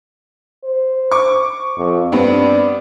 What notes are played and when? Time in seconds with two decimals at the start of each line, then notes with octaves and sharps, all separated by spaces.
0.64 C5
1.11 C#6 D6
1.77 F2
2.12 G2 B3 C4 D5